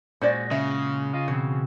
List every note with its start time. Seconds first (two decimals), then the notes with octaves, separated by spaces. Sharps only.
0.22 A#2 G#3 C#4 F#4 C5 D5
0.51 C#3 E5
1.13 F4 D#5 F5
1.28 B2 E3 C4 F#4